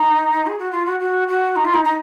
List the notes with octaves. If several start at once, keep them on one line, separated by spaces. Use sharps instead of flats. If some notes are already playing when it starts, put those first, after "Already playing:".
Already playing: D#4
G#4
F#4
F4
F#4
F#4
F#4
D#4
F4
D#4
D#4